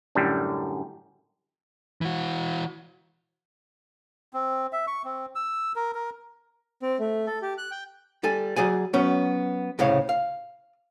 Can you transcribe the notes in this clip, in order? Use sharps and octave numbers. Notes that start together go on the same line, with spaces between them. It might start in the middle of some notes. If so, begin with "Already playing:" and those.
F#2 A2 D3 G3
E3 F#4
C4
E5
C#6
C4
E6
A#4
A#4
C4
A3
A4
G4
F#6
G5
G3 A4 G#5
F#3 G#4 D5 G#5
F#3 B3 C#4
C2 A2 C#3 C#5 F5
F5